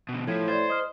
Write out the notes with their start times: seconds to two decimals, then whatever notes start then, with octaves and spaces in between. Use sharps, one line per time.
0.09 B2 D3
0.28 A2 F3 G#6 B6
0.48 C5 D5 G#6 A6
0.68 D#5 D#6 F6